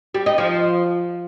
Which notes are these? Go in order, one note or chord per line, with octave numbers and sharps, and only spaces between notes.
G3
D#4
F3